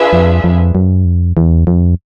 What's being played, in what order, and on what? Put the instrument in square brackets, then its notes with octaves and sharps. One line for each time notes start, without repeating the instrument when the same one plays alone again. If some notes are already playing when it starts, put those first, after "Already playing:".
Already playing: [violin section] D4 F4 G#4 B4 E5
[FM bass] F2
F2
F#2
F2
E2
F2